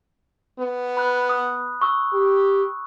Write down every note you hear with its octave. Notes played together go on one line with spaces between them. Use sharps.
B3
B5 F#6
D#6
C#6 D#6 E6
G4